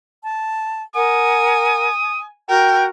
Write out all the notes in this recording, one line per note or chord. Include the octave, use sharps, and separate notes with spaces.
A5
A#4 F#5 G#5 D#6
F#4 A#4 G5